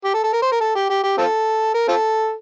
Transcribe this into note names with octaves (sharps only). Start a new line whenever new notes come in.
G4
A4
A4
A#4
C5
A#4
A4
G4
G4
G4
C4 F4 A4
A#4
C4 F4 A4